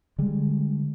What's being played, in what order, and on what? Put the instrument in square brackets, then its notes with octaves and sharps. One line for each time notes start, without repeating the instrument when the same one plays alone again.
[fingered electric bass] D3 G3 G#3